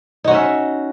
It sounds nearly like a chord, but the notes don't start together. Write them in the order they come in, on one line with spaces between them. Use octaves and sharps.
D#4 F#4 C#4 E5